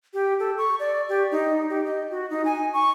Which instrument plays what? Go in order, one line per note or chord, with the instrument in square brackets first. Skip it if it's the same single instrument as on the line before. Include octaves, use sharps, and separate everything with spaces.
[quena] G4
A4
C#6
D5
G4
D#4
G4
D#5
F#4
D#4
G#5
C#6